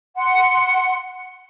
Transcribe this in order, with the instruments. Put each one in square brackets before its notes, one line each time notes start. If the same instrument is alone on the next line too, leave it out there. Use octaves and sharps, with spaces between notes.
[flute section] F#5 C6